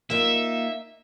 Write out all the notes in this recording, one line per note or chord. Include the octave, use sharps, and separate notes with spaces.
A#3 D#4 F4 E5